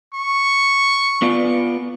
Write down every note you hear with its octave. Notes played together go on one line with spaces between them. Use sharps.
C#6
B3 F4 D5